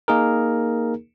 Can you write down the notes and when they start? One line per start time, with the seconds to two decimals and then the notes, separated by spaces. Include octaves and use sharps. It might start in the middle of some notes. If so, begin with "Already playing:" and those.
0.08 A#3 D#4 G#4 A#4